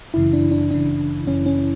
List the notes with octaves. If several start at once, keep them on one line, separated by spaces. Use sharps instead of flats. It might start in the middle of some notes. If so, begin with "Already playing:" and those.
G1 F#2 C#3 E3 E4
D4
D4
G1 F#2 C#3 E3 D4
G1 F#2 C#3 E3 C#4
C#4
C#4